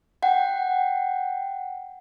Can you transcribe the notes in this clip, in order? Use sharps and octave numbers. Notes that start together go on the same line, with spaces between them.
F#5 G5